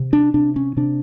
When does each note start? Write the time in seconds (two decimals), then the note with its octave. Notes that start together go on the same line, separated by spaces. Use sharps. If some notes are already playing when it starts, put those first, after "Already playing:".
Already playing: C3
0.13 D4
0.34 C3 D4
0.56 C#4
0.77 C3 D4